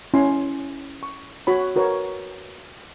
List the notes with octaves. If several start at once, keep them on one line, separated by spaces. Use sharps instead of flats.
C#4 E4 G#5 C6
C#6
F#4 C#5 B5
F#4 A#4 B4 C#5